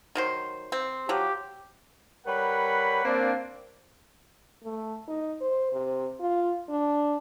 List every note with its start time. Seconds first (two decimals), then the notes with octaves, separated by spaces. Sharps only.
0.15 D#3 F#3 C5
0.72 C4
1.09 F3 F#3 G4
2.27 G3 A#4 B4 C#5 F#5 B5
3.05 A#3 C4 D4
4.64 A3
5.08 D#4
5.41 C5
5.73 C3
6.20 F4
6.69 D4